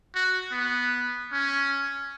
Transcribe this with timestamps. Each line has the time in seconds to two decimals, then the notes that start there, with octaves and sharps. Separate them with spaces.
0.15 F#4
0.51 B3
1.32 C#4